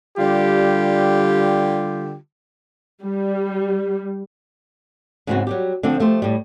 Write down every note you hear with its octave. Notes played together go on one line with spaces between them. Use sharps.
D3 G3 F4 G4
G3
G#2 C#3 E3 B3 C4 F#4
F#3 G3 G4
D3 F3 C4 D4
F3 A3 G4 C5
A2 G3